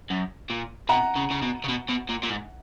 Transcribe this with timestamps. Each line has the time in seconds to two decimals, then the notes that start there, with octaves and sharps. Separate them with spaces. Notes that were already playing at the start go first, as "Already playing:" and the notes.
0.10 F#2
0.50 A#2
0.89 B2 F#5 A#5
1.16 C#3
1.31 C#3
1.42 B2
1.64 C#3
1.69 B2
1.89 B2
2.09 A#2
2.23 A#2
2.29 G#2